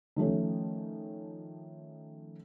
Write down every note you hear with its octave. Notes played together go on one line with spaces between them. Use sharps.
D#3 F3 A3 C#4